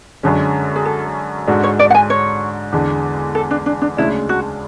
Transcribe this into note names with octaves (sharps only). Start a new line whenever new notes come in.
F#2 D3 G#3 C#4
G#4
A4
G#2 G#3 D4 F#4 A4
C#5
D5
F#5
G#5
C#5
E2 D3 G#3
A4
D4
D4
D4
D2 C#3 G#3 D4 E4
F#4